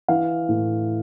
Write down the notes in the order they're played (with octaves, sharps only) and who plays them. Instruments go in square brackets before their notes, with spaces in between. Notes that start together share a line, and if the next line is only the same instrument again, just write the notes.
[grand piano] E3 F5
A2